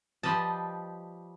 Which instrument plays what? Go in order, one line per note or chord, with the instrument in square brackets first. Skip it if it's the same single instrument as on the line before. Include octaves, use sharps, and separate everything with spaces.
[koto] F3 G3 B4 D#5 A5